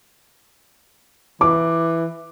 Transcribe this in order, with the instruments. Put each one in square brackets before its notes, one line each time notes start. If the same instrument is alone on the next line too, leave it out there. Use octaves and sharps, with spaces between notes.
[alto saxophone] E3 [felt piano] D6